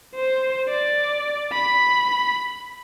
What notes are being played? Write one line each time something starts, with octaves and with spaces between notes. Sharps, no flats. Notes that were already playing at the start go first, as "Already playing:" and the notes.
C5
D5
B5